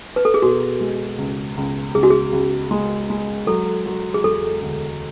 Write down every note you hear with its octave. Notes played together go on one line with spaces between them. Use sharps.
B4
A4
G#4
B2 F#4
G#3
C#2
C#2
C#2 G#4
F#4
G#4
C#2
G#3
G#3
F#3 A4
F#3
G#4
E1 A4
D2